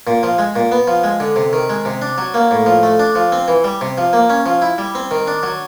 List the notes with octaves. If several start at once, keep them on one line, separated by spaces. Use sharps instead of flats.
A#2
F3
G#3
A#2
B3
F3
G#3
D3
C3
D#3
G#3
C3
D4
F#3
A#3
A2
F3
A3
D4
F3
C4
E3
G3
C3
F3
A#3
C#4
F3
E4
G3
C4
D#3
D4
F#3